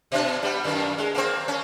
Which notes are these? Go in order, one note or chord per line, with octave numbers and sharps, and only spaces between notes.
B2 D4
G3 B3
F#2 D#3 A#3
G#3
A#3 C4
C#4